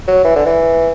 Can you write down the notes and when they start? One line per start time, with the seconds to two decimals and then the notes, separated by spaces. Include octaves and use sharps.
0.07 F#3
0.24 E3
0.36 D3
0.46 E3